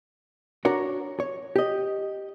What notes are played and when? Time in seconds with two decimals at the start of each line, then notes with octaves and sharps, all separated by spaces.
0.65 D4 F#4 A#4 C#5
1.20 C#5
1.56 G4 D#5